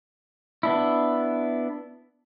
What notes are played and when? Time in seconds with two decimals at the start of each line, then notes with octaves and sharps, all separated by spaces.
0.63 B3 D4 E4